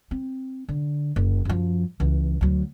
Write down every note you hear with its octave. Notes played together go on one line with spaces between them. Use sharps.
C4
D3
F#1
F#2 F3
C#2 E3
D2 F#3